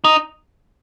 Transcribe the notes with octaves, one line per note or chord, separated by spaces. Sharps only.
D#4